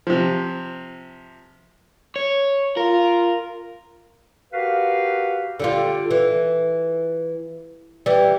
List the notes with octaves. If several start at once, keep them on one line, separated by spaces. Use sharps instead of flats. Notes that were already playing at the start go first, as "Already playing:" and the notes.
C3 F3
C#5
F4 A#4
F#4 G4 A#4 B4 F5
D3 G3 F4
E3
E3 G3